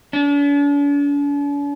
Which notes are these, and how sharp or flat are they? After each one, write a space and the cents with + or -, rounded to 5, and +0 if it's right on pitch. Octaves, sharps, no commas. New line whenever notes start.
D4 -45